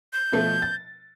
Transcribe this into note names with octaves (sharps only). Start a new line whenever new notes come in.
G6
B2 F3 A3
A6